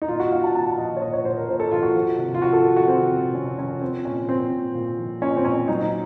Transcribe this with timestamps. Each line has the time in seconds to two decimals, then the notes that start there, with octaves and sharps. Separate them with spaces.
0.02 D#4
0.08 A#2 F4
0.20 F#4
0.32 A#2 F5
0.44 A5
0.55 A#2 A5
0.67 F#5
0.78 F3 D#5
0.97 C#5
1.02 A#2 D#5
1.13 C#5
1.25 A#2 C5
1.37 A#4
1.49 A#2 C5
1.60 A4
1.71 F3 F4
1.83 F#4
1.95 F3
2.19 C3
2.34 F4
2.41 F3 F#4
2.53 A4
2.64 F3
2.77 F#4
2.88 C3 C4
3.11 C3
3.35 C3 C#4
3.58 F3 C#4
3.81 F3 C4
4.04 A#2 C#4
4.29 F3 C4
4.51 A#2
4.75 A#2
4.98 F3
5.21 A#2 C#4
5.37 C4
5.45 A#2 C#4
5.68 F#3 D#4